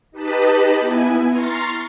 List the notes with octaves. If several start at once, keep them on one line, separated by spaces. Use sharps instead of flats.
D#4 G4 B4 D#5 A5 B5
B3 E4 G#5
A#5 C6 C#6 F6 A6